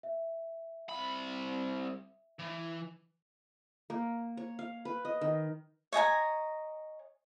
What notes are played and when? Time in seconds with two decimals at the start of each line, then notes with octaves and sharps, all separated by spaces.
0.03 E5
0.89 C2 B5
2.39 E3
3.90 A#3
4.37 C#5
4.59 F5
4.85 B4
5.05 D#5
5.21 D#3
5.93 C#5 D#5 G#5 A#5